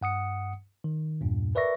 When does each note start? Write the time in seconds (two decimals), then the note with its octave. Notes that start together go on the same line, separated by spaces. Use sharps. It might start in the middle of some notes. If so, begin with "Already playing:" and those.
0.01 G2 F#5 D#6 C#7
0.84 D#3
1.21 E2 G2 A#2
1.55 A#4 B4 D5 E5 C#6 A#6